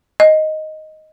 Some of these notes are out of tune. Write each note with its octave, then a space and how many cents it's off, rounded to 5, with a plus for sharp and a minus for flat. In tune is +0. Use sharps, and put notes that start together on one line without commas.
D#5 +0